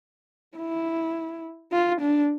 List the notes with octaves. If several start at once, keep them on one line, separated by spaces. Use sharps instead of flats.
E4
F4
D4